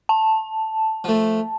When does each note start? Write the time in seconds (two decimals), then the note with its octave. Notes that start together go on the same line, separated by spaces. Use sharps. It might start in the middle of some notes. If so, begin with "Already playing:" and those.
0.09 A5
1.04 F3 A3